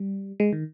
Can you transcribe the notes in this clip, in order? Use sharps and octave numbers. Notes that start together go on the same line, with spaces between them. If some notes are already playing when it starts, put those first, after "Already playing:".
Already playing: G3
G#3
D#3